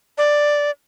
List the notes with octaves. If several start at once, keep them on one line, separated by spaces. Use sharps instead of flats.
D5